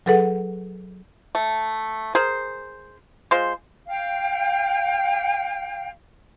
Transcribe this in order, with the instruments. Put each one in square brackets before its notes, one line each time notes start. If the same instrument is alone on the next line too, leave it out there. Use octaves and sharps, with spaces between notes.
[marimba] F#3 G#4 A4 B4 F#5
[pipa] A3
G#4 A#4 C5
G#3 F4 C5
[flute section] F5 G5